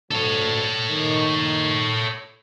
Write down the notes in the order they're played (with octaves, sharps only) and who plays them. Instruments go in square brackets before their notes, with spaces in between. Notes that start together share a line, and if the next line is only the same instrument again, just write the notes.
[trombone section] D2 D3 F#3 [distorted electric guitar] A4 C#5
[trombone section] D#3